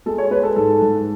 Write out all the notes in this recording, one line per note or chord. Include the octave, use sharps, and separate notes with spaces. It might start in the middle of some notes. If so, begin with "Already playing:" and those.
G#3 A4
C#5
G#3 B4
A4
G#2 A4
G#2